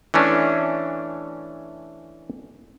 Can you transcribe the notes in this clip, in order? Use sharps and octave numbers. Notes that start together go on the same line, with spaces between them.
E3 A3 C#4 D4